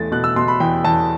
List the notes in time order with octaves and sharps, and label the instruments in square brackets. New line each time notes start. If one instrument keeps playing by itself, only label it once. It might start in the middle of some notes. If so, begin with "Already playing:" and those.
Already playing: [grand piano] E2 A3 A6
B2 F#6
E6
B2 C6
B5
E2 G5
E2 A5